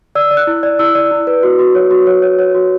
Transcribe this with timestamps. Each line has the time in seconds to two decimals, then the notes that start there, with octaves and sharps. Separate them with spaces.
0.15 D5 E6
0.31 D5
0.37 F#6
0.47 E4
0.63 D5
0.79 E4 E6
0.95 D5
1.11 E4
1.27 B4
1.43 F#4
1.59 F#4
1.75 C#5
1.91 F#4
2.07 C#5
2.22 C#5
2.39 C#5
2.55 F#4